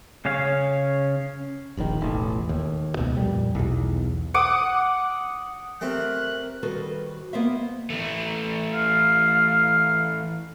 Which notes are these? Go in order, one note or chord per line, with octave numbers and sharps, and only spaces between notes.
C#3 C#4 C#5 F5
D#1 A#1 A#2 D#3
E1 A1
D#2
C#2 B2
F2 A#2 G3
B1 E2
F#5 D6 D#6
G3 A3 C4 A#4 F#6
D#3 G3 F#4 A4 B4 C5
A#3 B3 A#4 C5 D#5 E5
E3 A3
F5